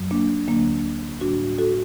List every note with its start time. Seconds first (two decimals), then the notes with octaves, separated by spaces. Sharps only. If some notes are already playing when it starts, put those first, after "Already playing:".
Already playing: F#2 F#3
0.11 A#3 D4
0.47 D2 D3 F#3 A#3 D4
1.21 A2 G3 D4 F#4
1.58 F#4 A4